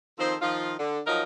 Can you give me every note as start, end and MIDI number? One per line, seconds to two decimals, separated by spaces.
0.19 0.35 51
0.19 0.35 53
0.19 0.35 60
0.19 0.35 69
0.19 0.35 72
0.41 0.74 51
0.41 0.74 53
0.41 0.74 65
0.79 0.99 50
1.07 1.23 53
1.07 1.23 54
1.07 1.23 63
1.07 1.23 70